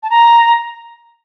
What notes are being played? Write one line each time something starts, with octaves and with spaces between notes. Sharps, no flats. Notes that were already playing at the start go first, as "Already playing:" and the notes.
A5
A#5